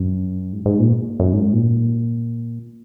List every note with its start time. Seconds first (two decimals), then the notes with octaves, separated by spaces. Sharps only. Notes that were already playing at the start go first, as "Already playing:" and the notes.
Already playing: F#2
0.53 G#2
0.66 G#2
0.79 A#2
1.20 F#2
1.33 G#2
1.53 A#2